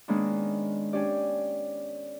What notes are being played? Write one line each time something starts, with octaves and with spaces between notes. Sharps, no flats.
D#3 G#3 A#3 B3 C#4 D4
C#4 D4 G4 D5